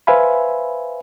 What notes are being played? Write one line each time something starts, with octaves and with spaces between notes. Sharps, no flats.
B4 C5 E5 F5 G#5 B5